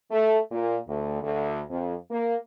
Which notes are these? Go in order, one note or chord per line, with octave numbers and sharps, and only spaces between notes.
A3
A#2
D2
D2
F2
A#3